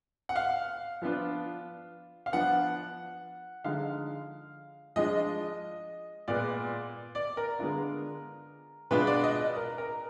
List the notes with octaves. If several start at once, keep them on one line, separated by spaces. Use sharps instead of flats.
F#5
F5
F3 B3 D4 F4
F5
F3 B3 D4 F#5
D3 F3 G#3 D#4 F5
F3 G#3 D4 F4 D#5
A#2 G#3 B3 D5
D5
A#4
D3 G#3 B3 D4 F4
B2 G#3 D4 F4 B4
D5
D#5
A#4
A#4